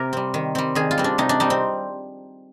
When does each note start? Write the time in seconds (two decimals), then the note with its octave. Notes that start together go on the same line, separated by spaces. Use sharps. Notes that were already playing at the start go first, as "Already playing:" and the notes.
Already playing: C3 G4 A#4
0.13 G3 C4
0.34 D#3
0.55 G3 C4
0.75 D#3 G#4
0.91 F4
0.98 G3 C4
1.04 D4
1.18 C3 D#4
1.29 D4
1.40 G3 C4 D#4
1.50 C4